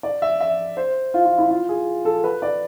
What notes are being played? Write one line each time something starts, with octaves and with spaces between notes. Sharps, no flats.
D5
E5
E5
C5
F4
F4
E4
F4
G#4
A4
B4
D5